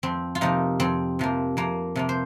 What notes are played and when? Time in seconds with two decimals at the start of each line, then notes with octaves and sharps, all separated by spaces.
0.03 F2 C4
0.35 F4
0.41 C3 F3 A#3 D#4
0.80 F2 C4
1.19 C3 F3 A#3
1.57 F2 A#3
1.96 C3 F3 A#3
2.09 C5